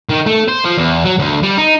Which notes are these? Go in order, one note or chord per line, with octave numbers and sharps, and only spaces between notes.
D#3
A3
C5
F3
E2
F#3
D2
G3
D#4